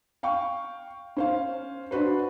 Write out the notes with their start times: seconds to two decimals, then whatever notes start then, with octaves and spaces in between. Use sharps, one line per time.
0.23 F5 G5 C#6
1.17 C#4 C5 F5
1.91 D4 F#4 B4 C5